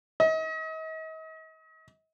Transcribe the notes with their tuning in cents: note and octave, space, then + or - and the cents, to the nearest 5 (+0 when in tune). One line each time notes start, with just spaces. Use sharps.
D#5 +40